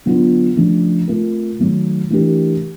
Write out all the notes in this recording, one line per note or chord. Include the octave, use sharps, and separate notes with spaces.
D3 F#3 B3 D4 F4
C#3 F3 A3 D4
A3 C4 F4 A#4
D#3 F#3 A3
E3 A3 D4 G4 A#4